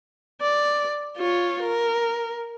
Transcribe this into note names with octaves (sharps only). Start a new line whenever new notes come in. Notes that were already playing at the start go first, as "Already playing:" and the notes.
D5
F4 C#5
A#4